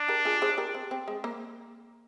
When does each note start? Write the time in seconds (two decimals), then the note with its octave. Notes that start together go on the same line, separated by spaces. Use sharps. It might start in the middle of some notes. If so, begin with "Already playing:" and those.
Already playing: D4
0.08 G4 A#4
0.25 F4 G#4
0.42 G#4 C5
0.58 G4 A#4
0.74 C4
0.91 C4
1.08 G#3
1.24 A#3